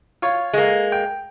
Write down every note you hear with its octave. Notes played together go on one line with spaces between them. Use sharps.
F4 C#5
G#3 A#3
G5